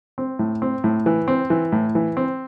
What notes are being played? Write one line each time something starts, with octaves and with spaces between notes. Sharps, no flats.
C4
A2
C4
A2
E3
C4
E3
A2
E3
C4